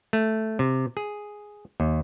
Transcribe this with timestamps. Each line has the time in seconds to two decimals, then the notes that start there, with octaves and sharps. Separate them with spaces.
0.13 A3
0.59 C3
0.97 G#4
1.80 D#2